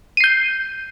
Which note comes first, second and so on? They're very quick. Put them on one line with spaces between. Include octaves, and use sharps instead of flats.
D#7 C7 G6